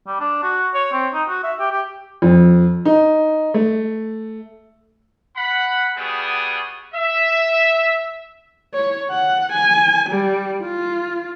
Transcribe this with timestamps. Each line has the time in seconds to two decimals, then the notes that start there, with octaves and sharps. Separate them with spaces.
0.07 G3
0.20 D4
0.43 F#4
0.74 C#5
0.93 C4
1.14 D#4
1.29 F#4
1.44 E5
1.60 G4
1.71 G4
2.22 F2
2.85 D#4
3.54 A3
5.36 F#5 B5
5.97 G3 B3 F#4 G#4 G5 D#6
6.94 E5
8.74 C#5
9.11 F#5
9.53 G#5
10.10 G3
10.63 F4